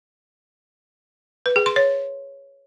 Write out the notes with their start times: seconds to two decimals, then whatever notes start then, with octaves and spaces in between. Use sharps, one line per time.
1.46 B4
1.56 G#4
1.66 C6
1.76 C#5